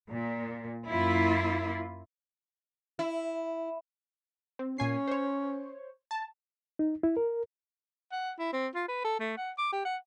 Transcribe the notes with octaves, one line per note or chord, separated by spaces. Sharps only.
A#2
F#2 A#3 E4 F4
E4
C4
A#2 C#4 G#5 C7
C5 C#5
A5
D#4
E4
A#4
F#5
E4
C4
F4
B4
A4
A3
F#5
D6
G4
F#5